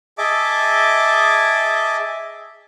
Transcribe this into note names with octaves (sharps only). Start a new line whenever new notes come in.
G#4 D#5 E5 A5 D6